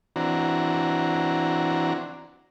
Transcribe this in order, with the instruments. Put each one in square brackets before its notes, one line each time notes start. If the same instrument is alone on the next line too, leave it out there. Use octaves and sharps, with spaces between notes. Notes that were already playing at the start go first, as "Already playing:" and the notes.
[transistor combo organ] E3 C4 D4 F#4 A#5